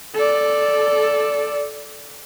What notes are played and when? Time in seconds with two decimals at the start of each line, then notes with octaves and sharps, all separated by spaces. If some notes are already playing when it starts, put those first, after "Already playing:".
0.14 A4 D5